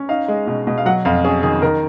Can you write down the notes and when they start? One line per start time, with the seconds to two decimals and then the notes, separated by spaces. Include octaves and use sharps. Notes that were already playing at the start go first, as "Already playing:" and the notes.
Already playing: C#4
0.09 D#4 F5
0.28 G#3
0.47 B2
0.67 B2
0.78 F5
0.86 F#3 F#5
1.05 F2 F5
1.24 C#4 G#4
1.43 D#3 G#4
1.62 D#3 A#4